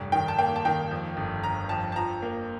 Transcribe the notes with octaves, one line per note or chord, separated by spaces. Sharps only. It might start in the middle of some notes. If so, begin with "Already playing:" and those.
Already playing: F1 G2
D#3 G5
A5
A#3 G5
A5
D#3 G5
F2
G1
G1 A#5
F2 A5
A5
F3 A#5
A#3